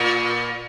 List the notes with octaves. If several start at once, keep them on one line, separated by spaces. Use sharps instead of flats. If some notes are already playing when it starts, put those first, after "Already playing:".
Already playing: A#2